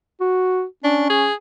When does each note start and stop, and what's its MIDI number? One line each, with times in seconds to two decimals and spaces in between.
0.21 0.64 66
0.84 1.27 61
0.84 1.08 62
1.10 1.34 68